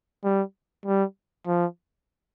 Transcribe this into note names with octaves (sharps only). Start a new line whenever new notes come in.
G3
G3
F3